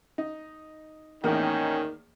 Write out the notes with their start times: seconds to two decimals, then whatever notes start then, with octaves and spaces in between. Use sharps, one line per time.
0.18 D#4
1.24 E2 A2 D#3 A#3 C#4 D#4 G5